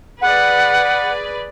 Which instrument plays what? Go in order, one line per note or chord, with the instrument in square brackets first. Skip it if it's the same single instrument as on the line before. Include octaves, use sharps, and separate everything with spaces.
[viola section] G#4 B4 D5 [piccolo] F#5